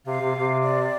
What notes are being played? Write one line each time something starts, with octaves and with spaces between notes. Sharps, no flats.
C3 F5
C3
C3
D5